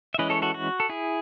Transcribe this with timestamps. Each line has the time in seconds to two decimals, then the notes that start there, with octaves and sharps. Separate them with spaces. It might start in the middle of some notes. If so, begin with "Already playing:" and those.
0.14 E5
0.19 E3 G#3 C#4 E4 B4 D#5
0.30 A4 C#5
0.42 F#4 A4
0.54 F#4
0.80 A4
0.89 E4 G#4